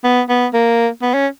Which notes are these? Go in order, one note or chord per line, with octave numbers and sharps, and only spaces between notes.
B3
B3
A#3
B3
C#4